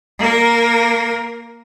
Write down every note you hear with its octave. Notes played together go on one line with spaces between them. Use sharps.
A#3 A#4